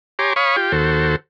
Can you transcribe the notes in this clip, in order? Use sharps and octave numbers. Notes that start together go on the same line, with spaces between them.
G4 C#5 G#5 A#5 C6 D6
C#5 F5 B5 C#6 D#6
F4 G4 G5
D#2 F#4 A4 C5